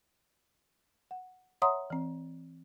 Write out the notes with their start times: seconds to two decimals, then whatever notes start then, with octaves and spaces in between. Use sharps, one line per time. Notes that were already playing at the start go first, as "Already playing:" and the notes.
1.11 F#5
1.62 C#5 E5 F#5 A#5 C6 D#6
1.90 E3 C4